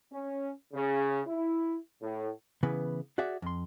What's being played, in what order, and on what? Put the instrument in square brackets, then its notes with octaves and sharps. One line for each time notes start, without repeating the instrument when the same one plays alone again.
[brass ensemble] C#4
C#3
E4
A2
[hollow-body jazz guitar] C#3 E3 B3 B4
F#4 G#4 D5 E5 F#5
F2 C6